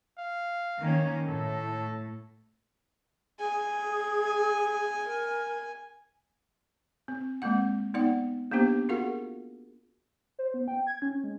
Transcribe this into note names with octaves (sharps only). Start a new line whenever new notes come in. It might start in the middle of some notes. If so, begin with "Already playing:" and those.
F5
D#3 A#3 C#4
A2 A4
G#4 G#5
A#4
C4
G#3 A#3 C4 F#5
B3 D#4 D5 F#5
A#3 B3 C#4 D4 G4 C5
F4 F#4 G#4 A#4 F5 F#5
C5
B3
G5
G#6
C#4
G#3